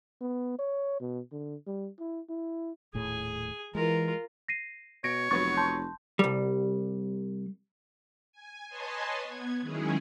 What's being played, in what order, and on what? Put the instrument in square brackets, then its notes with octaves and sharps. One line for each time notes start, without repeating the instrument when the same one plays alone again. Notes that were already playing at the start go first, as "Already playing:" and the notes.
[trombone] B3
C#5
B2
D3
G3
E4
E4
[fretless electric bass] D#1 A2 [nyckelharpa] G#4 G#5
[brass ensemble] E3 [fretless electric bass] G#3 [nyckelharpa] F4 A#4
[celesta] A#6 C7 D#7
[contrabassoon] B2 [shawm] C#5 [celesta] A#6 [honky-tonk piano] D7
[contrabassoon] F1 [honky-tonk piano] F#3 B3 C#6 [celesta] A6
[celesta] A5 C6 G6
[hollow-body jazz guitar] C2 G3
[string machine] G#5
B4 C#5 D#5 G#5 A5 C6
B3 G#6
D#3 F#3 G#3 C#4 E4 G#4